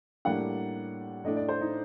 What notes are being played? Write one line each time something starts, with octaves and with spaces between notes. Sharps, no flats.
A2 G3 A#3 D4 F#5
A2 A3 D4 D#5
D5
C5
D#4